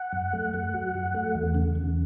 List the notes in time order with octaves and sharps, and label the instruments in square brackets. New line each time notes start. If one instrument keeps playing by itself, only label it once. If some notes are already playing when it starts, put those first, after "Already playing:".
Already playing: [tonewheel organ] F#5
F#2
A3
F#2
F#3
F#2
A3
E2
C#3
E2